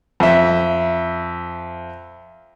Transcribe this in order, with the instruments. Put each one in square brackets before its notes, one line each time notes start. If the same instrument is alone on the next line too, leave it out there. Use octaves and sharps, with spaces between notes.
[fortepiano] F2 E5